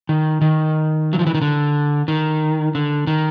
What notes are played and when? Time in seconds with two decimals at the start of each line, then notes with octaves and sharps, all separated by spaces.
0.09 D#3
0.41 D#3
1.13 F#3
1.19 F3
1.27 E3
1.35 D#3
1.41 D3
2.08 D#3
2.75 D3
3.07 D#3